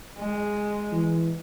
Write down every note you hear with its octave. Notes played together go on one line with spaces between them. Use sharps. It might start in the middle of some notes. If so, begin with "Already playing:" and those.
G#3
E3